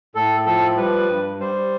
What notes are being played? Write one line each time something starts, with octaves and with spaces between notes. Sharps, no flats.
A2 A4
F3 A4
G3 B4
G2
G3 C5